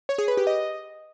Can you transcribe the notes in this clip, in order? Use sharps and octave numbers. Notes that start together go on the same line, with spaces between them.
C#5
G#4
B4
G4
D#5